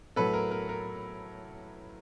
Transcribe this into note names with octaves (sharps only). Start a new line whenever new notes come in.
A2 F#3 A3 A4 B4
A#4
A#4
A#4